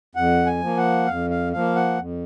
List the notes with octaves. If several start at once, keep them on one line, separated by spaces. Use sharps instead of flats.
F2 F#5
G#5
F3 A#3
F#5
F2 F5
F5
F3 A#3 F5
F#5
F2